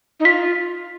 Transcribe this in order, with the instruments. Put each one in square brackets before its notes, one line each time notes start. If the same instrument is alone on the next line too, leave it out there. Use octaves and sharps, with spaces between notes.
[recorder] D#4
[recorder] F4 [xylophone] B6